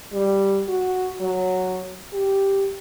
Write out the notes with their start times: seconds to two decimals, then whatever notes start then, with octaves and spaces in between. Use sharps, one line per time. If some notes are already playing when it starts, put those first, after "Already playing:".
0.13 G3
0.68 F#4
1.21 F#3
2.13 G4